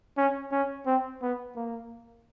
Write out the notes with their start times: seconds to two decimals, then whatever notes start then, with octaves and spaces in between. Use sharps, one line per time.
0.17 C#4
0.52 C#4
0.86 C4
1.22 B3
1.56 A#3